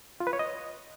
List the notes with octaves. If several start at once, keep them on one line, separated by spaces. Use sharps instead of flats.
F4
B4
C#5
D#5